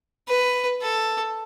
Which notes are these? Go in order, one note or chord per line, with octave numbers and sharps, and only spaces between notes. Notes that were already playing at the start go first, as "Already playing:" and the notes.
B4
A4